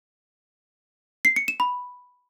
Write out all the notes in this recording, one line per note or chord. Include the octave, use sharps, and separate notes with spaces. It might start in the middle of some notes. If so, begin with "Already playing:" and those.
C7
C#7
E7
B5